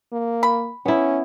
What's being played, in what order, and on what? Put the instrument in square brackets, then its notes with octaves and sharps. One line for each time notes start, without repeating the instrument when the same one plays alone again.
[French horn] A#3
[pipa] B5
[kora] B3 E4 [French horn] C#4